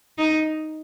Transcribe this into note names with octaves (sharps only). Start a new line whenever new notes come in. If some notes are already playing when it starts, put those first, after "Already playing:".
D#4